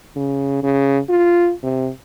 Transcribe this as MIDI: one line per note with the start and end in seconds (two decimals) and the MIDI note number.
0.16 0.60 49
0.63 0.98 49
1.09 1.52 65
1.63 1.89 48